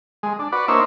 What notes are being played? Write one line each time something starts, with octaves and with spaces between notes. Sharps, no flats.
G#3
D4
F#4 B4 D5
A#3 D4 D#4 C5 C#5 E5